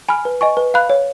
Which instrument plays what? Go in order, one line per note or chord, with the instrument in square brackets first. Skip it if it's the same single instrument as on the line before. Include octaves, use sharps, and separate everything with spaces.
[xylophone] G#5 B5 F6
B4
D#5 G#5 C#6
B4
F5 B5 F#6
C#5